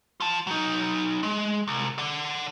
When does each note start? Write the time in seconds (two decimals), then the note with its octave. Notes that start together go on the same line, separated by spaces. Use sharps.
0.20 F4 A5
0.47 F#3 D#4
1.23 G#3
1.68 C2
1.98 D5 F#5